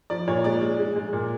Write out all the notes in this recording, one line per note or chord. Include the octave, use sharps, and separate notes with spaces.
F3 D5
A#2 C#5
G#3 D5
G#3
G#3
G#3
A#2